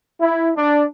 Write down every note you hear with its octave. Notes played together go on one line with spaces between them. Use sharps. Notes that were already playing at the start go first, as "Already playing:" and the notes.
E4
D4